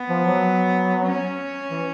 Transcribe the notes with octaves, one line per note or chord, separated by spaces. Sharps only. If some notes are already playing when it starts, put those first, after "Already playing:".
Already playing: B3
F3
F#3
C#4
E3